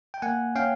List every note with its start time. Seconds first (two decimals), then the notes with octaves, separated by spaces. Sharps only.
0.14 G5
0.22 A#3 F#5 G#5
0.55 C#4 F5 G5